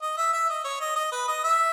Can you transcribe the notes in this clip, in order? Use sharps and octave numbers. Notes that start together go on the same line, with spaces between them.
D#5
E5
E5
D#5
C#5
D#5
D#5
B4
D#5
E5